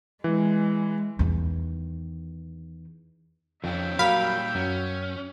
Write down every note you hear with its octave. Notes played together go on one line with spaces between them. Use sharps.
E3 G#3
E2 D#3
F2 D#3 C4 C#4 E5 G5
A#2 F#3 G3 A#4 F5 B5
F#2 C#4